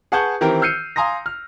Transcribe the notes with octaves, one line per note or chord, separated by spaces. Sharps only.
G#4 B4 F#5 A5 C#6 G6
D#3 E3 C4 G4 A#4
E6 F6 G6 C7 C#7 D#7
F5 G#5 A#5 C6 D#6 A#6
F6